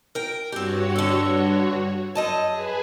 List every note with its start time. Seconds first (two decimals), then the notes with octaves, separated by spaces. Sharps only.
0.15 A#4 G5
0.52 G2 C4 F#4 G4 C#5
0.96 D3 A4
2.15 F#2 D#5 A5
2.50 G#4 B4 G#5